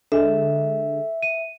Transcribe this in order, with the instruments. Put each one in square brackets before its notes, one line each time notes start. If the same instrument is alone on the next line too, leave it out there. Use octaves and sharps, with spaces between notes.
[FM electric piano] D3 G#3 [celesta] A4 [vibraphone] E5
[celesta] D#7